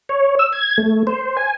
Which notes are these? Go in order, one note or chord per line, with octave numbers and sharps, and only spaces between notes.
C#5
E6
G#6
A3
C5
G#5